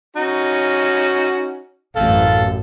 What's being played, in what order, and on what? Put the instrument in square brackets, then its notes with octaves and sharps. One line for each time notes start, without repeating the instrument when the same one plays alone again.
[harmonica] C#4 D#4 F#4
[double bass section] A1 F#2 [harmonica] A4 F5